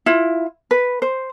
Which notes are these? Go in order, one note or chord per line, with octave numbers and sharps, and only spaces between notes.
E4 F4
B4
C5